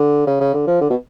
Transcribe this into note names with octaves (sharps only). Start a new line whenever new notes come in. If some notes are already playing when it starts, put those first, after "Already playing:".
Already playing: D3
C#3
C#3
D3
F3
D3
B2